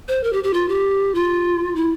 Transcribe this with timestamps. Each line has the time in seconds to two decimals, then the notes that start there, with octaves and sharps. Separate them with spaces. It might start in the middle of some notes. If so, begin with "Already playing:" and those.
0.08 C5
0.24 A#4
0.33 G4
0.44 G4
0.54 F4
0.69 G4
1.15 F4
1.76 E4